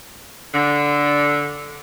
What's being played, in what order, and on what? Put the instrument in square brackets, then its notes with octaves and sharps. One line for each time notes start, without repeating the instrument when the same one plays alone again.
[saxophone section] D3